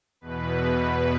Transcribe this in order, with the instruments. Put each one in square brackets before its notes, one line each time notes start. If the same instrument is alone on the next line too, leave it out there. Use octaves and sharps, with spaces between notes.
[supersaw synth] E2 B2 B4